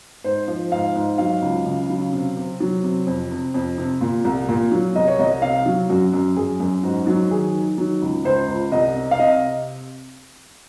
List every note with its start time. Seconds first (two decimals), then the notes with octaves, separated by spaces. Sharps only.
0.24 G#2 C5
0.48 F3
0.71 G#2 F5
0.96 G#2
1.18 F#3 F5
1.42 C#2
1.66 C#3
1.90 F#3
2.13 C3
2.37 C3
2.60 F#3
2.84 C3
3.07 F2
3.31 C3
3.54 F2
3.78 C3
4.01 A#2
4.25 C2
4.49 A#2
4.72 F#3
4.96 C2 D#5
5.08 C#5
5.19 C2 D#5
5.42 C3 F5
5.66 F#3
5.90 F#2 F#4
6.14 F#2
6.37 F#2 G#4
6.60 F#2
6.83 G#2 F#4
7.07 F#3
7.31 D#3 G#4
7.55 D#3
7.78 F#3
8.02 C#2
8.24 C#2 C5
8.48 C#2
8.72 C2 D#5
8.96 C3
9.11 F5
9.19 C3 D#5